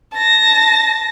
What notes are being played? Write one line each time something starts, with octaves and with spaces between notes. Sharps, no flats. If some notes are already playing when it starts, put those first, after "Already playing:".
A5 A#6